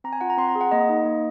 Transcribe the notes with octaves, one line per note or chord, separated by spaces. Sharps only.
C4 A#5
G#5
F4 F#5
A#5
C4 C6
A#5
G#4
F#5
A#3 D#5
D#4
A#3